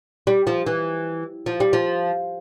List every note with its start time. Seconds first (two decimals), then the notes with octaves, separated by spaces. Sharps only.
0.27 G3
0.47 F3
0.67 E3
1.46 F3
1.60 G3
1.73 F3